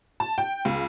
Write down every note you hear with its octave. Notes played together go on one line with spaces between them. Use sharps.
A5
G5
C#2